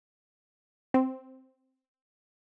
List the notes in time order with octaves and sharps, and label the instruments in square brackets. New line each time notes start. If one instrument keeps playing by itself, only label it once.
[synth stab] C4